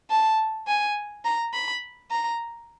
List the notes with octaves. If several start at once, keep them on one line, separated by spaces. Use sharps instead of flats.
A5
G#5
A#5
B5
A#5